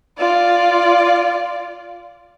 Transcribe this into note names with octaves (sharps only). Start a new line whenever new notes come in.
F4 D5